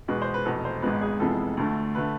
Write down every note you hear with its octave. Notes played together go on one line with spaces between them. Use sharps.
E2 B2 G#3 B3 B4
C5
B4
F1 E2 B2 A4
C5
G#1 G#2 G#3 B3 B4
G#4
F1 F2 E3 G#3 B3 A4
D2 D3 A3
D3 A3 B4